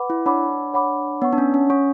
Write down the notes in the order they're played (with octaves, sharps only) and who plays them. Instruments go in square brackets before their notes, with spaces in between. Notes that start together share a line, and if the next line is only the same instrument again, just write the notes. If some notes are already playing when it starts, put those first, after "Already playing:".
Already playing: [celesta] B4 F#5 B5 D6
[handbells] E4
[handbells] D4 [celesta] C#5 F#5 B5 D6
[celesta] C#5 F#5 B5 D6
[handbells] B3 [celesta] C#5 F#5 C#6
[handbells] D4
C#4
C#4
[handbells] C#4 [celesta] C#5 F#5 C#6